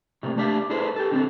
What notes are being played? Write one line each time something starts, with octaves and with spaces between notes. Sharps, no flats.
A2 C3 A#3
A3 D4 G4 E5 F5
E4 G#4 A4 B4 C5
G4 A4
D3 C4 A4